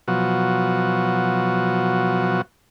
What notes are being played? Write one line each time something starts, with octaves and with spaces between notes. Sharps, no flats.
B2 F3 F#3 F#4